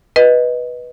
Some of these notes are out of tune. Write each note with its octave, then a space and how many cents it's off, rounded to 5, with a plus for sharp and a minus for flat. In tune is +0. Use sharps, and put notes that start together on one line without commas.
B4 -10 D#5 +0